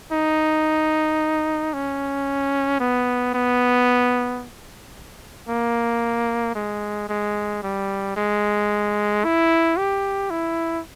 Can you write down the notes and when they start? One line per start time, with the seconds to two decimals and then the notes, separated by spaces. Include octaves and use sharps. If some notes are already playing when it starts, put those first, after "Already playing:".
0.12 D#4
1.73 C#4
2.80 B3
3.34 B3
5.49 A#3
6.55 G#3
7.09 G#3
7.63 G3
8.17 G#3
9.24 E4
9.78 G4
10.30 E4